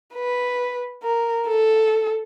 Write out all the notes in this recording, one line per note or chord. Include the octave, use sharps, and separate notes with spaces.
B4
A#4
A4